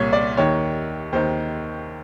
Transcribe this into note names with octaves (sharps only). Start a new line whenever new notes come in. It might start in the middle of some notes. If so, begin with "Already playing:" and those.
Already playing: C2 A#2 C#5
D5
D#2 D#3 C#5
D#2 D#3 C5